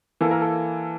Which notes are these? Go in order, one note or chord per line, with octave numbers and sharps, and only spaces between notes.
E3 A#3 A4
A#4
A4